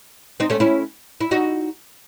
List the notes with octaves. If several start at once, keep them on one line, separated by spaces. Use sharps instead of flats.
C4 D#4
A3 C#4
C#4 E4
E4
D#4 F#4